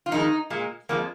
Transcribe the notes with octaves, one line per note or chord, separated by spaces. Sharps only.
F4
F2 D#3 G#3 D#4
A#2 G#3
F2 F3 G#3 A#3